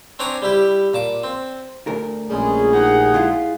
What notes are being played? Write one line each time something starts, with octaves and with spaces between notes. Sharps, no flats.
C4 D4 C#5 D5 G#5 A#5
G3 E4 G4
A#2 A5 D6
C4
D2 A#4
A#1 G3 G#3 C#4 G#4
D#4 G4 F#5
G#3 E4 F4